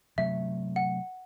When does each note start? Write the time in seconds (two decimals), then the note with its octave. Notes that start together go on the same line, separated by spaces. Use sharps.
0.18 C3 F#3 A3 E5
0.76 F#5